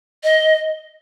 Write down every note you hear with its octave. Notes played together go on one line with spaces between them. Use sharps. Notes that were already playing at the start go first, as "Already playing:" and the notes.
D#5